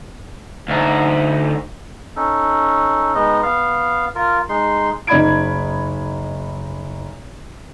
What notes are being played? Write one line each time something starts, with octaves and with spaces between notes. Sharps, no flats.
D2 D#4
C#4 D#4 A4
G#3 B3 D#4 D#5
B3 F5
F4 A#4
G#3 D#4 C6
F#1 D#4 D5 B5 G#6 D7